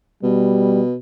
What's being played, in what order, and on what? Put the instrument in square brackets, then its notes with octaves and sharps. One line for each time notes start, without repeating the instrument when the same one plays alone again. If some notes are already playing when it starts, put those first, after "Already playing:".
[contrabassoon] B2 [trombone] G3